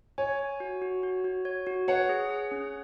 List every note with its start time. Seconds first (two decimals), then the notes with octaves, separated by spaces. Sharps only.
0.18 C#5 G#5
0.39 G#5
0.60 F#4
0.82 F#4
1.03 F#4
1.24 F#4
1.45 C#5
1.67 F#4
1.88 B4 C#5 F#5
2.09 G#4
2.30 G#4
2.51 C#4